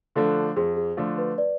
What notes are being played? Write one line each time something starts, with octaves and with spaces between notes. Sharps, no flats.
D3 F3 A3 D4 A4
F2 G#4
G#4
D3 F3 A3 D4
B4
B4 D5